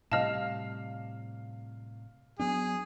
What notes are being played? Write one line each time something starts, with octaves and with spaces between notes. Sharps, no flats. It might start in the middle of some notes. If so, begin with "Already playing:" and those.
A2 C3 G3 D#5 F5 A5 F6
F#3 B3 D4 G#4